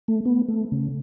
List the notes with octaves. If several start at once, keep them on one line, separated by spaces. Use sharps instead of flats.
A3
B3
A3
C#3